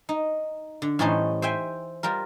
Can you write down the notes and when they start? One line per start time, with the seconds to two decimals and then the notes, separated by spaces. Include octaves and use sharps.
0.09 D#4
0.82 D3
0.99 A2 E3 G3 C#4 D#4 C5
1.42 C5 E5 G5 G#5
2.03 G3 F4 A#4